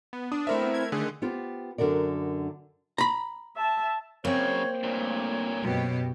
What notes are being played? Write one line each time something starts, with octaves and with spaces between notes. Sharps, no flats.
B3
D4 D#6
A3 C4 E4 A#4 C5 E5
B3
G#6
D3 D#3 A3 G#4
B3 F4 G4 C5
F#2 D3 F#4 A#4 D5
A#5 B5
E5 A5
F#2 C#3 A#3 C4 C#5
G2 A#2 A3 C#5
F#2 B2 G4